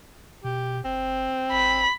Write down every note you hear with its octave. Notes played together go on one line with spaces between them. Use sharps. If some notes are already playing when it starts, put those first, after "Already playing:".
B2 G4
F#1 C4
G#1 B5